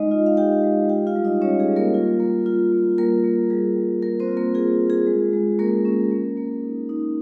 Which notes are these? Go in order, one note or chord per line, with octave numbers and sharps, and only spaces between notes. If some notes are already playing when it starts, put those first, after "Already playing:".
Already playing: G#3 D#4 D#5
F4
F5
F4 G4 G5
G#3
F4 G4 G5
F4 F5
G3
D#4 D#5
G3 C#4 C#5
G#4
G3
A#3 A#4
F4
A#3
F4
A#3
G3 A#3 A#4
A#3
G3 G#4
G3
A#3 F4 A#4
C4 C5
F4
A#3 A#4
F4 G#4
F4
G#4
G#3
G#3
A#3 C#4 A#4
C#4
A#3
A#3
D#4
D#4